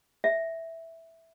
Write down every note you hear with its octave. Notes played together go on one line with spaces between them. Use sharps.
E5